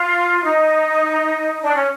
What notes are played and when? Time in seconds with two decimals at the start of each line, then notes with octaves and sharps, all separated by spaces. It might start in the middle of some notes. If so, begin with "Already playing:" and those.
Already playing: F4
0.43 D#4
1.63 D4
1.75 C#4